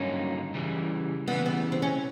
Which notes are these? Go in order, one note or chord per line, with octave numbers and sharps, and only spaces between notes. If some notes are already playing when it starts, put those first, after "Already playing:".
Already playing: G2 D3 F#3 A#3 C#4 D#4
C#3 E3 G3
C#3 E3 G3 B3
B3
C4
C#4